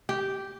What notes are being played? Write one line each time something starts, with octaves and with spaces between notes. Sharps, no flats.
G4